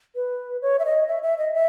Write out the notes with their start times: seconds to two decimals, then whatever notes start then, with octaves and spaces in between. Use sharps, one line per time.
0.15 B4
0.62 C#5
0.79 E5
0.85 D#5
1.08 E5
1.23 E5
1.39 D#5
1.54 E5